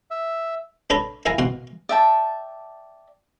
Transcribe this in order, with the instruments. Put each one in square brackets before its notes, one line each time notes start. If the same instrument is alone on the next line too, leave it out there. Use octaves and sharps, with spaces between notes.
[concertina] E5
[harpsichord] D4 A4 B4 C#5 A#5 B5
E4 A#4 E5 F5 G#5 A#5
B2 F#5 C6
[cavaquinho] D5 E5 G5 A5